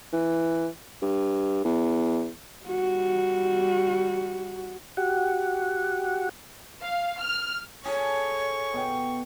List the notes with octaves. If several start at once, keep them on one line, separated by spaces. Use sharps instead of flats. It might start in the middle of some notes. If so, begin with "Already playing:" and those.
E3
G2
E2
G3 F#4
F#4 G4 F#5
F5
F6
G#4 A4 C#5 C#6
B2 G5